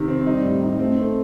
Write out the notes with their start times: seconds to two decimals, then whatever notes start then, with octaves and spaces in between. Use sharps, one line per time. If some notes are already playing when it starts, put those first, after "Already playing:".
Already playing: C3 D#3
0.08 C4
0.26 G3 D#4
0.44 A2
0.62 D#4
0.79 A3 C4
0.98 C4